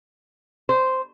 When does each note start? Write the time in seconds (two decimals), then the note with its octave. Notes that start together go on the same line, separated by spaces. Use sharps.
0.69 C5